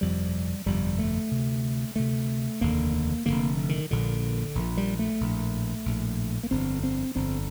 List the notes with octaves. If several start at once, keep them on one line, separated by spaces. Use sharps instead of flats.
G1 F2 C3 G3
G1 F2 C3 G3
A3
D2 C3
D2 C3 A3
F1 D#2 D3 A#3
F1 D#2 D3 A#3
D#3
A#1 A#2 D3
A#1 A#2
G3
A3
A#1 A2
A#1 A2
A#3
G1 F2 D3 C4
C4
G1 F2 D3 C4